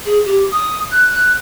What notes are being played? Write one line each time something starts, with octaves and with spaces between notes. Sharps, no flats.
G#4
G4
D#6
F#6
F#6